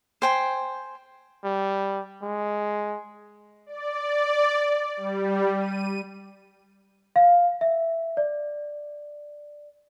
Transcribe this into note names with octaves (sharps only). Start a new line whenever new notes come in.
C5 G5 G#5
G3
G#3
D5
G3
D#7
F5
E5
D5